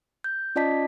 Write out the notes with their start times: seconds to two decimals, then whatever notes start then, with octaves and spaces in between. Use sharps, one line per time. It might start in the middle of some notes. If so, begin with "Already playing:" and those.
0.24 G6
0.56 C#4 F4 D5 D#5 A5 B6